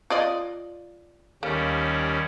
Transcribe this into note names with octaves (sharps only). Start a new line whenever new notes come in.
F4 D5 D#5
D#2 G3 A#3 C#4